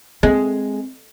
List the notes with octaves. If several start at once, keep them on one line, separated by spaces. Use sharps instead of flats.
G#3 C4